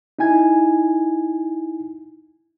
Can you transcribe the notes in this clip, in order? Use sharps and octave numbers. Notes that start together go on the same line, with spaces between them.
D#4 E4 G#5 G#6